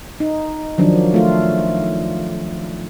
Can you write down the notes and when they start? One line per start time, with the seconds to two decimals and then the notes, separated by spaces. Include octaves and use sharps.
0.20 D#4
0.78 D#3 F3 F#3 D4
1.14 A3 F4